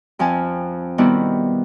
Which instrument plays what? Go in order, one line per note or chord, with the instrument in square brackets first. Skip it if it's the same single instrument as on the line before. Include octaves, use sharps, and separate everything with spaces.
[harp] F2 F3 C4 G#5 A5
B2 D#3 G3 B3 C4 E4